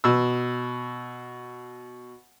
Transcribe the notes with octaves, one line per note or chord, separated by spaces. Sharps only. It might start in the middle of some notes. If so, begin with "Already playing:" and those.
B2 E6